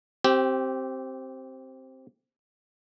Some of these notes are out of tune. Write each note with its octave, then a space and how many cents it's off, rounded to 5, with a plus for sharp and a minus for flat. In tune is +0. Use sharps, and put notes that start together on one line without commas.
C4 +5 G4 -20